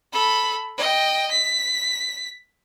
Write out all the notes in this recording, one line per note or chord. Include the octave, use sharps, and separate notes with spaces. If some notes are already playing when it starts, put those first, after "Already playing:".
A4 B5
D#5 G5
B6